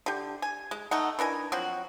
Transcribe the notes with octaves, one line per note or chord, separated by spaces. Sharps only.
D3 G4
G#5
G#3
A3 D#4 F#5
E3 D4 A#4 G#5
F3 F#3 C4 F#4